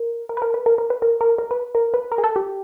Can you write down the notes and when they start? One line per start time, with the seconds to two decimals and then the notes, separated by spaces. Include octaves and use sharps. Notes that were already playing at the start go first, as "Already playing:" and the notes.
Already playing: A#4
0.29 A#4
0.37 B4
0.42 A#4
0.54 B4
0.66 A#4
0.78 A#4
0.90 B4
1.02 A#4
1.21 A#4
1.38 A#4
1.51 B4
1.75 A#4
1.94 B4
2.12 A#4
2.18 G#4
2.24 A4
2.36 G4